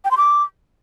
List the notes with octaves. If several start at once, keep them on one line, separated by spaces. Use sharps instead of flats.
G5
C6
D6